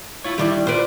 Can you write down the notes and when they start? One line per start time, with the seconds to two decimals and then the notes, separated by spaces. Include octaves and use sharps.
0.24 E4 F4 C#5
0.38 D#3 G3 D4 E4
0.67 F4 B4 C5 D5